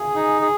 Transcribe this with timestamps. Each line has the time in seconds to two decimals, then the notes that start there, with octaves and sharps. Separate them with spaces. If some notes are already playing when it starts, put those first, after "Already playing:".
Already playing: G#4 G#5
0.15 D#4
0.41 G#4